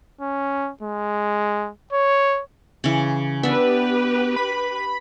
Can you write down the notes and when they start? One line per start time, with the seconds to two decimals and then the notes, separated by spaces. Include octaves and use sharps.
0.21 C#4
0.83 G#3
1.93 C#5
2.84 C#3 E3
3.43 B3 D4 G4 B4 E5
4.36 B5